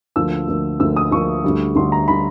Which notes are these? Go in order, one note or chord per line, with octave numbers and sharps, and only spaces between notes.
D2 D3 F3 A#3 E6
D2 D3 F3 A#3
D2 D3 F3 A#3 E6
D#6
D2 D3 F3 A#3 C#6
D2 D3 G3
D2 D3 G3 C6
A#5
D3 G3 B5